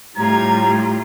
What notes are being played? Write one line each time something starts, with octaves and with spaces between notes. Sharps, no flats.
A2 G3 F4 G4 A#5 G#6